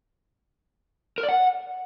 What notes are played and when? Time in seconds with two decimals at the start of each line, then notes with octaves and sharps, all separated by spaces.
1.18 A#4
1.23 D5
1.29 F#5